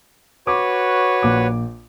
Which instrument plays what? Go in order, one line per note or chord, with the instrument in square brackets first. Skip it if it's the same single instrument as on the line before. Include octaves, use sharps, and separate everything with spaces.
[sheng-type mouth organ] F#4 B4 C#5 [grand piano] D6
[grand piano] A#1 D6